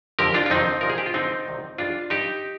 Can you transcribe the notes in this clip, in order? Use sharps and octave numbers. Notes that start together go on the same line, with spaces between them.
F2 D3 F3 G4 A#4
D4 F4
F4
F2 C3 D#3 C4 D#4
C2 A#2 F3 A#4
G#4
G4
F4
G2 D3 F3 C4 D#4
C2 C3 D#3
G2 F3 D4 F4
G2 F3 D#4 G4